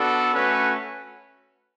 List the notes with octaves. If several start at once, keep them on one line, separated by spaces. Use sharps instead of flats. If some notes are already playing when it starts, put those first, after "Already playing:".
Already playing: B3 D4 F#4 A4
A3 C#4 F#4 B4